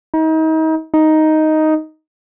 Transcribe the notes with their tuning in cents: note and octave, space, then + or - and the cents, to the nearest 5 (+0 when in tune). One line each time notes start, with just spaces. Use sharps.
D#4 +35
D#4 +5